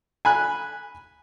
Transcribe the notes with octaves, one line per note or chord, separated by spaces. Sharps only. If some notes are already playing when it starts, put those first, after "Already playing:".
G#5 B5 F#6